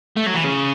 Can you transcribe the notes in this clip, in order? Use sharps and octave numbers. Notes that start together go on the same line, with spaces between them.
A3
F#3
E3
C#3